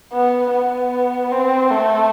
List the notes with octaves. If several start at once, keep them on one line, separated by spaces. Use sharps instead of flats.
B3
B3
C4
A3